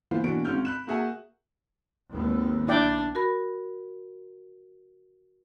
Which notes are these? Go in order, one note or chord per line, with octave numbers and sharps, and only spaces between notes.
E3 A#3 B3 F4 C5
B2 E3 A#3 D4 F#4 D7
G#1 G#2 C#4 F#4 F6 G6
B5 F#6 E7
A#3 F#4 G#4 E5 F#5 G#5
G#1 D#2 B3
B1 D4 E4 D5 G5
F#4 A#4 B5